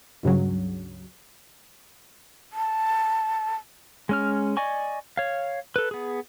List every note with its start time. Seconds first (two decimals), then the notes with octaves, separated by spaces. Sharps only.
0.23 C#2 G2 C#3 F#3
2.53 A5
4.09 G#3 C#4 F6
4.57 D5 D#5 G#5 C#6
5.17 C#5 F5
5.76 A4 B4
5.91 B3 G#4